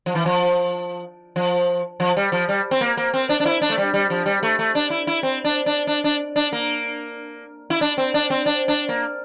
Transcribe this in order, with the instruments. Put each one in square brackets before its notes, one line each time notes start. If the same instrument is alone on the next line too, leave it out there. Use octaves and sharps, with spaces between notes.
[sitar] F3
E3
F3
F3
F3
G3
F3
G3
C4
A#3
A#3
C4
D4
D4
E4
D4
A3
G3
G3
F3
G3
A3
A3
D4
E4
E4
C4
D4
D4
D4
D4
D4
A#3
E4
D4
C4
D4
C4
D4
D4
A#3